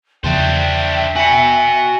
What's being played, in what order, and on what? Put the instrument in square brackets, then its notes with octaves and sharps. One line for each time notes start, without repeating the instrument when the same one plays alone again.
[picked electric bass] E2 C#3 F3 [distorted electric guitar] D4 C5 [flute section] E5 G5
[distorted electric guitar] F#4 B5 [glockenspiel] G#5 A#6 C#7